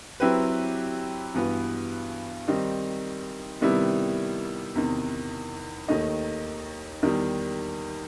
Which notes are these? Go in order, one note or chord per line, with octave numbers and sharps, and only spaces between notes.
F#3 C4 E4 G4 B4
G2 E3 B3 F#4 B4
D#3 G3 C4 D#4
C3 D#3 G3 B3 E4
E2 C3 D#3
D#2 D#3 A3 D#4
E2 D#3 G3